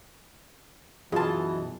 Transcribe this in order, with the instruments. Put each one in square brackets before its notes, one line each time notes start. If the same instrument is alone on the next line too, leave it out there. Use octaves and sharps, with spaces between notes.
[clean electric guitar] B1 F#2 [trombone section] B2 E3 [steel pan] F4 G#4 [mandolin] D#5 A5